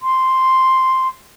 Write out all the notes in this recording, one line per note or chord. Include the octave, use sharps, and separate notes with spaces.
C6